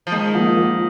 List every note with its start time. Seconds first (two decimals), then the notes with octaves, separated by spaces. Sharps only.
0.07 F3
0.12 D#3 G#3
0.35 F3 A#3
0.57 F3 A#3